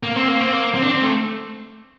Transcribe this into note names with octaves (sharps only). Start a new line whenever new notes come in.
A#3
C4
A#3
C4
A#3
C4
D4
C4
A3